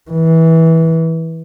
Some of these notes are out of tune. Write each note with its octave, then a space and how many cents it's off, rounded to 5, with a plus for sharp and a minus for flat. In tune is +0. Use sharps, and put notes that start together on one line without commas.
E3 -20